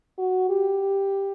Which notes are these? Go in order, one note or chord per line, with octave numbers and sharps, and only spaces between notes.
F#4
G4